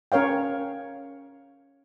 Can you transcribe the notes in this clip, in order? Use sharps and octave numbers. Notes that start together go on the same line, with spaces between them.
C#4 A#4 C#5 F5 G5